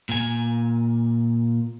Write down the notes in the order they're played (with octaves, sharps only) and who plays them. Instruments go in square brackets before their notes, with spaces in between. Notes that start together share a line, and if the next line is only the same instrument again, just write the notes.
[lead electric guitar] A#2 G#5